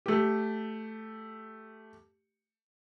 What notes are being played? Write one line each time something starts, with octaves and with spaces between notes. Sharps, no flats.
A3 G4